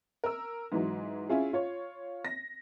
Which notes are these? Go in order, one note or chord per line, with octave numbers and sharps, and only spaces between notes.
A#4 E6
G#2 E3 F#3
C#4 E4 F4 G#4
F4 C#5
A#6